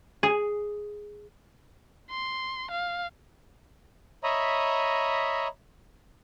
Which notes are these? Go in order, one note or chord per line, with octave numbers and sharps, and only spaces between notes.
G#4
C6
F5
C#5 D#5 E5 A#5 B5 D#6